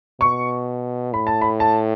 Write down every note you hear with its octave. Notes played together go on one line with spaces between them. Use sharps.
B2 C#6
A2 B5
A5
B5
A5